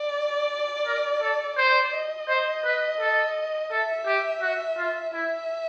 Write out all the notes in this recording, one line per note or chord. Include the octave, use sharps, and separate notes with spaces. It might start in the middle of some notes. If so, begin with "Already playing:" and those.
Already playing: D5
A#4
A4
C5 D5
D#5
C5
B4
A4
A4 E5
G4
F#4
F4
E4 E5